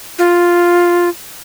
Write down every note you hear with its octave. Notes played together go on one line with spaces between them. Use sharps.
F4